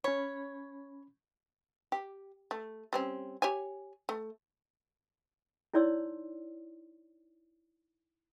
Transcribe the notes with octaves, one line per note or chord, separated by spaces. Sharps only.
C#4 C#5 B5
G4
A3
G3 C4 C#4
G4 C#5 G#5
A3
D#4 E4 C#5 D5 C6 E6